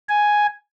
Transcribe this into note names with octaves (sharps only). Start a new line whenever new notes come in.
G#5